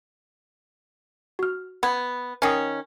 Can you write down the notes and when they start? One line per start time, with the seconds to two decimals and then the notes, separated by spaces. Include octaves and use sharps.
1.39 F#4 F6
1.83 B3 F#5 B5 G#6
2.42 D#3 C#4 G#5 D#6